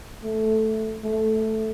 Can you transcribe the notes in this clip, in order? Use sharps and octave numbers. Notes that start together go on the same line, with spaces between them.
A3
A3